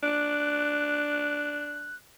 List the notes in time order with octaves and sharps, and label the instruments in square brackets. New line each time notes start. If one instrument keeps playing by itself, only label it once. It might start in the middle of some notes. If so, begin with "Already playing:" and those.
[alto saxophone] D4 [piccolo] F#6